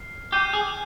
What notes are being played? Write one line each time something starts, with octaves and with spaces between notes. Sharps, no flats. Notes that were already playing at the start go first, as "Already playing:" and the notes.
Already playing: F6 C7
G4 G6 C7 D#7
G#4